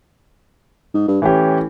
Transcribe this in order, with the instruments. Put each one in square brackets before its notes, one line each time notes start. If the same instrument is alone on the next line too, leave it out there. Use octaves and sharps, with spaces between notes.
[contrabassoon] G#2
G2
[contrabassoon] A2 [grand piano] E3 C#4 G4